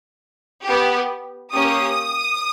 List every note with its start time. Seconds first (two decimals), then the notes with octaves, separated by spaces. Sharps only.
0.65 B3 G4
1.52 A#3 C#4 G4 D#6